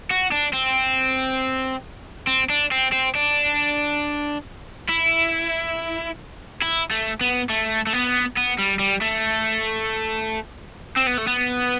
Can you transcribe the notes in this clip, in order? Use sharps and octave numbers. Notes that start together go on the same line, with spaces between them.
F#4
D4
C4
C4
D4
C4
C4
D4
E4
E4
A3
B3
A3
A3
B3
B3
G3
G3
A3
C4
B3
A3
B3